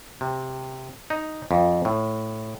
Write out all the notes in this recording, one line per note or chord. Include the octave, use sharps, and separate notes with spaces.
C3
D#4
F2
A2